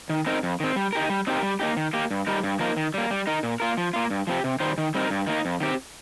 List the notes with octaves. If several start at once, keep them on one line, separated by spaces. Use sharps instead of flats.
D#3
C4 D#4 A#4
F2
D#3 C4
G3
D#4 G4 A#4
G3
C4 D#4 G4 A#4
G3
A#3 D#4 G4
D#3
A#3 G4
G2
G3 D#4 A#4
G2
F3 A#3 D#4 A#4
D#3
G3 A#3
G3
D#4 A#4
A#2
A#3 F4 A#4
F3
A#3 F4
G2
F3 C4 G4
C3
D#3 G3 D#4 C5
D#3
G3 C4 D#4 A#4
G2
D#3 A#3 D#4
F2
D#3 C4 G4